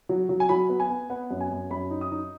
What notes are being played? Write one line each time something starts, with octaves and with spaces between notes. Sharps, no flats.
F#3
F#3
G#5
F#3 B5
B3
G#5
B3
B3 F#5
F#2
G#5
F#2
F#2 B5
D#4
D#6
D#4